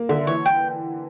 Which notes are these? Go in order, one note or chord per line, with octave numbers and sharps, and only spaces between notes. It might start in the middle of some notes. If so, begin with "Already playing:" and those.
Already playing: A#3
D3 E5
E3 C#5
G5